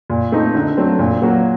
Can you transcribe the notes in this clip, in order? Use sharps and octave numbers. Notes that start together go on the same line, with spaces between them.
A#2
A3 C4 D#4
D3
F#3 A3 C4
A#2
F#3 A#3 F#4